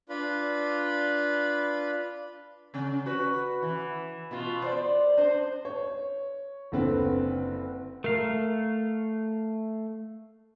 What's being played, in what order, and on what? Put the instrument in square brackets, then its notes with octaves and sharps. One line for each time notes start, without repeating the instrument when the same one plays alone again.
[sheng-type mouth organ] D4 F4 B4 B5
[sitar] C#3 C#4
F#4 B4
E3
B2 B3 F4
C5 D5
D4 C5
[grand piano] C#5
F#1 D3 C4 B4 F#5
[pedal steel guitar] A3 F5 [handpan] A#4